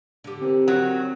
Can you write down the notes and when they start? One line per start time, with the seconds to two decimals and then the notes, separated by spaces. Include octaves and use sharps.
0.24 D3 G4
0.41 C4 A#4
0.68 D#3 F#3